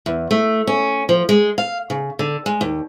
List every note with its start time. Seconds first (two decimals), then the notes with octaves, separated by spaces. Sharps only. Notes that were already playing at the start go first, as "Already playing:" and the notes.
0.06 E2
0.31 A3
0.67 C#4
1.09 F3
1.29 G#3
1.58 F5
1.90 C#3
2.19 D3
2.46 G#3
2.61 D#2